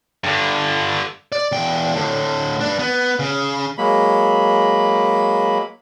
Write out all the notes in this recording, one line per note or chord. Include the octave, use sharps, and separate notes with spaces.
G2 D3
D5
E2 G5
A2 D3
G2 D4
B3
C#3
F#3 G#3 A#3 B5